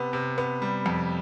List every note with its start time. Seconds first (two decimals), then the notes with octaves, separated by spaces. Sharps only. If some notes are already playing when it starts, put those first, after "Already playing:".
Already playing: C3 B3
0.13 C3
0.38 B3
0.62 G3
0.86 F2